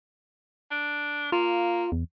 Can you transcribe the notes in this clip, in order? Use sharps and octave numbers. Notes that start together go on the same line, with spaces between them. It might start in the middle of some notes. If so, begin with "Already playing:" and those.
D4
A#3 F4
E2